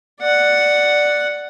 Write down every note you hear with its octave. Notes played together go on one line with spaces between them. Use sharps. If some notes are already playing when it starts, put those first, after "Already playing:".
D5 F#5